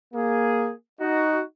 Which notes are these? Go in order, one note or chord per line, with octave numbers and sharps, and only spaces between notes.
A#3 G#4
D#4 F#4